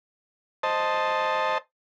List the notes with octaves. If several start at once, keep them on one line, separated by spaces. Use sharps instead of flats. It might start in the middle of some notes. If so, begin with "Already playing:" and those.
C5 D#5 A5